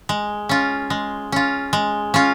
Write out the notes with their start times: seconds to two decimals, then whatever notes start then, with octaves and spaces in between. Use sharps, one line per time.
0.09 G#3
0.49 C#4 F4
0.90 G#3
1.32 C#4 F4
1.73 G#3
2.14 C#4 F4